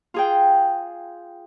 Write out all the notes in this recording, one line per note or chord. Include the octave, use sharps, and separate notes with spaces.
F4 G#4 G5